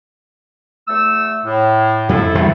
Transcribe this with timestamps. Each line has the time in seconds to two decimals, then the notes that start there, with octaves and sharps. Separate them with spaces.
0.87 E2 A3 E6
1.44 A2
2.09 F2 E4 A4
2.35 E2 D3 G3